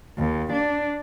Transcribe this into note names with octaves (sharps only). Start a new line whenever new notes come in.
D#2
D4